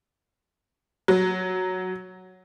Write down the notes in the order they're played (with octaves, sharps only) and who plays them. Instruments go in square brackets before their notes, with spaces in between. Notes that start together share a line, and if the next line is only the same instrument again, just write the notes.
[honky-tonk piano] F#3